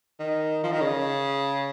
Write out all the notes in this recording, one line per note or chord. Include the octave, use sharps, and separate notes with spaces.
D#3
F3
D#3
C#3